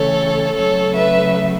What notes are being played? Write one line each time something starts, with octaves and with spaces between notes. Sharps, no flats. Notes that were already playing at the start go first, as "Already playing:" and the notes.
Already playing: C#3 E3 A3 A4 C#5
C#3 F#3 A3 A4 C#5
B4 E5